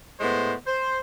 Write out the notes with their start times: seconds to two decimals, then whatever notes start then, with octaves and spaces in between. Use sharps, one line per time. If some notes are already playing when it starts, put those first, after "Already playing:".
0.20 A2 G#3 B3 C5
0.67 C5